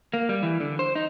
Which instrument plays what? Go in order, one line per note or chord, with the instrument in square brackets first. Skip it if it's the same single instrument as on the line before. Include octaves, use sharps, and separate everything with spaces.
[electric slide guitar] A#3
G3
E3
D3
C5
D#4